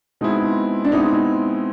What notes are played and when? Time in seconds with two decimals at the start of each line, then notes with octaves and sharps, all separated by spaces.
0.21 B2 G#3 C4 D#4 E4
0.85 D4
0.92 B2 G#3 C4 D#4 E4